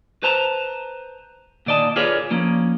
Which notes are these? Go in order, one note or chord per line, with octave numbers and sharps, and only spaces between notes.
B4 C5 A5 A#5
A#2 D#3 D5 D#5 A5
F4 G#4 A#4 B4 C#5 D5
F3 A#3 C#4